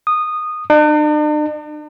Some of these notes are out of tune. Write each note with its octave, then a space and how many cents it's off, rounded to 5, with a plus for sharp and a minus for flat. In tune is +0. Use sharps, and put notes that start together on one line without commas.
D#6 -15
D4 +45